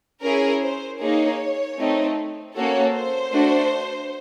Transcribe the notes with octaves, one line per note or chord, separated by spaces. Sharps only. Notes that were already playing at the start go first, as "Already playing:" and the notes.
C#4 E4 G#4 A#4
C5
A#3 D#4 G#4 C#5
A3 C4 D#4
A#3 C#4 F#4 A4 C#5
C5
A3 D4 F#4